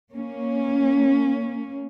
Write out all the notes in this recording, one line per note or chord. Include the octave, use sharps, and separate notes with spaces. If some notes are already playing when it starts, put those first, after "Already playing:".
A#3 C#4